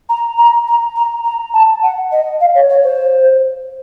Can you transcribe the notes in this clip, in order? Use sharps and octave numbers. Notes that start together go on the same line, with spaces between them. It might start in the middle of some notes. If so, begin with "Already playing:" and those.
A#5
A#5
A#5
A#5
A#5
A5
F#5
D#5
F5
C#5
C#5
C5